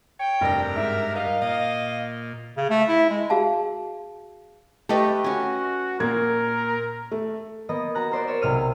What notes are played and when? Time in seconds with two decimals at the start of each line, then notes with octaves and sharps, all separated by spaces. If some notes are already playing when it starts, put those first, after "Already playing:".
0.19 C#5 G5
0.41 F1 G2 D4 A#4 A#6
0.76 G#2 E5
1.15 D#4 A#4 F5
1.41 A#2 D#5
2.57 C#3
2.70 A3
2.88 E4
3.10 G#3
3.30 F#4 G#4 F5 F#5 A5
4.89 A3 G4 B4 D#5 A5
5.24 C#4 F#4 G#5
6.00 A#2 A#3 A#4 G#6
7.12 A3
7.69 A#3 B3 D#5
7.95 F#4 A#5 F#6
8.11 A#4 C5 D5
8.27 C#5 D5 E7
8.41 B1 C3 F6 D#7